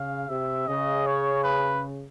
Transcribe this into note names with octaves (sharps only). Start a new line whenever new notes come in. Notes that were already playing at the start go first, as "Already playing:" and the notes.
Already playing: C#3 F5
C3 E5
C#3 D#5
C#5
B4